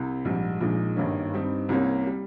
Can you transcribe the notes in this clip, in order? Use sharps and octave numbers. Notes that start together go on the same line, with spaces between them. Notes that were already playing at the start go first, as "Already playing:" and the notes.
Already playing: C2 C3
A#1 G#2 G3
A#1 A#2 G#3 D#4
G#1 G2 D#3 A#3 C#4
G2 G3 C4 D#4
C2 C3 G3 A#3 C#4
G3